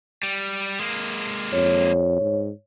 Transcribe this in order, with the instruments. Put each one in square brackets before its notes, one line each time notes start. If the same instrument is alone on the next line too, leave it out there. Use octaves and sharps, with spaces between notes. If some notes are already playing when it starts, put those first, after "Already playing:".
[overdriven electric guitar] G3
G#3 A#3
[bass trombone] F2 [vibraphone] C#5
[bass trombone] G#2